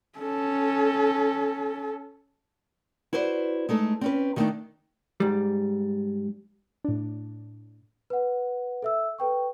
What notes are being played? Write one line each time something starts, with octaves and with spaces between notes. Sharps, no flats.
C#4 A4
E4 F#4 B4 C5 D5
G#3 A3 D#4 A4
C4 C#4 B4
D#3 G3 A3 C4 D4 D#4
G#2 G3
A2 D4
B4 F#5
A4 E5 E6
A4 B4 G5 C#6